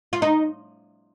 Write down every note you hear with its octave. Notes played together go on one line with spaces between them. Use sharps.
F4
D#4